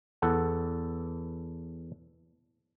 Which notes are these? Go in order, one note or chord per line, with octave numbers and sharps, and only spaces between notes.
E2 A4 F#5